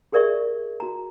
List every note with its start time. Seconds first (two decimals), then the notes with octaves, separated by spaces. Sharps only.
0.12 G4 G#4 A#4 D5 E5 C#6
0.80 F#4 A#5